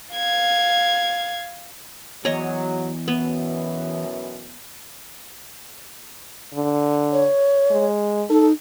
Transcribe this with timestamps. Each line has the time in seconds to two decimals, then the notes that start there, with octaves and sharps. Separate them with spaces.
0.14 F5 G#6
2.25 E2 F#3 C#5 D#5
3.08 F#2 B2 E3 B3
6.54 D3
7.12 C#5
7.71 G#3
8.30 D#4 A4